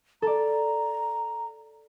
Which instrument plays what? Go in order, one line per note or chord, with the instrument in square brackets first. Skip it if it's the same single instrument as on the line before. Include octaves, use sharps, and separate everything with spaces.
[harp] A4 D5 [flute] A#5